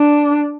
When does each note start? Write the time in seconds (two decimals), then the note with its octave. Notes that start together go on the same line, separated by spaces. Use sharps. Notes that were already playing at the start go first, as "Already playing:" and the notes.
Already playing: D4